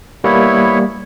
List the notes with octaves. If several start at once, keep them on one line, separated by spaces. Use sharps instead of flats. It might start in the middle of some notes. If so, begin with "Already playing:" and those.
G3 A#3 B3 E4 C#5